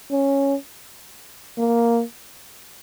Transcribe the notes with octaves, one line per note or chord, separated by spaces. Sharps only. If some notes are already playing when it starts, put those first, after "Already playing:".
C#4
A#3